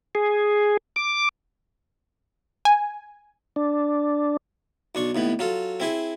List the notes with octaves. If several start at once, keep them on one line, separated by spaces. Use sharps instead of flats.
G#4
D6
G#5
D4
B1 D4 C#6
D#2 A2 B3
F#3 F4 A4
C4 E4 G#4